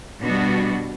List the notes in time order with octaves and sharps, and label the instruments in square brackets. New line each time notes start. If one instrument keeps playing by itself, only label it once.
[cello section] B2 G3 B3 D4 F#4